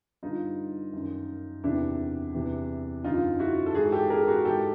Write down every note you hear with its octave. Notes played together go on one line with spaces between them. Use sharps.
G2 D3 D#4 F4
F#2 D#3
E2 C3 D#3 D4 E4
E2 C3 E3
F#2 D3 D#4 F4
E4 F#4
A4
G#2 E3 F#4 G#4
G4 A4
G#4 A#4
F#4 G#4
G#2 E3 G4 A4